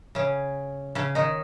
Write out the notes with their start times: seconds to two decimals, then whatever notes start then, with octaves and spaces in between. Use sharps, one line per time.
0.15 C#3 C#4
0.95 C#3 C#4
1.15 D#3 D#4